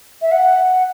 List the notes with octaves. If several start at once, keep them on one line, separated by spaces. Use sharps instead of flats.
E5
F#5